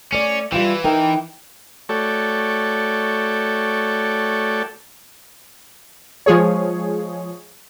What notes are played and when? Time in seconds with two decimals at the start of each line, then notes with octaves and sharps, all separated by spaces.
0.12 A3 C#4 D5
0.53 E3 G3 F4 G5
0.84 D#4 A#4 G5
1.89 A3 F#4 A4 C#5 D5 G5
6.26 F3 G#3 G#4 C#5